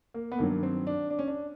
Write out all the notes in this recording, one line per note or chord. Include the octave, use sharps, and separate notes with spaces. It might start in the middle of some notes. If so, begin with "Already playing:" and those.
A#3
B3
G2 D#3 F#3 A#3
C4
D4
D4
C#4
D4